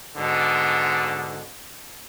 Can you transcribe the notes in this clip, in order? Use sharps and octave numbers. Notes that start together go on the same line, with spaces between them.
G#2 B2 D3